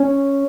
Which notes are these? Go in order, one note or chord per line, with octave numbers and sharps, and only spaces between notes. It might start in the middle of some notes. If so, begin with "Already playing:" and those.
Already playing: C#4